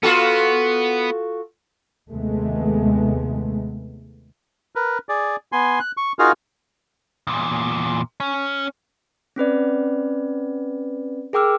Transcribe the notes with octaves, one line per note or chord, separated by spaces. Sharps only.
B3 F4 F#4 A4
D#2 C3 G#3 A3 B3
A#4 B4
G#4 D5
B3 G#5 C6
F#6
C#6
D#4 F4 F#4 G#4 A#4 F5
E2 A#2
C#4
C4 C#4 B4 D5
G#4 A#4 G5 D6 E6 F6